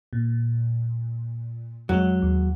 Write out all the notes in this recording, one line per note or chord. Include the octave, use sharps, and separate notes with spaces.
A#2
F2 F#3 G#3
D#2